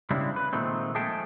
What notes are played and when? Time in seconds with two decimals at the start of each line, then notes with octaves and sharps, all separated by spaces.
0.10 C#3 G3 G#3 C4 D4 E4
0.36 B4
0.53 A#2 D#3 G#3 A3 C4
0.95 F3 G#3 A3 G#4 G5 A5